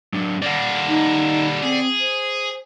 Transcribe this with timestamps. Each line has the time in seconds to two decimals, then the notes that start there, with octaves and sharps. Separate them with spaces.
0.13 F#3 D4
0.42 G3 A#3 D5 F#5
0.89 D#4
1.63 C4 G#4
2.00 C5